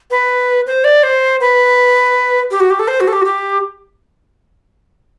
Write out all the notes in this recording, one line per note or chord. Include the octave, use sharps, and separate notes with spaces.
B4
C5
D5
C5
B4
G4
F#4
G4
A4
C5
F#4
A4
G4
F#4
G4